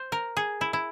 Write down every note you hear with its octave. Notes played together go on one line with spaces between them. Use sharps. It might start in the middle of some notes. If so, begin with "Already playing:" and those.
Already playing: C5
A#4
G#4
E4
E4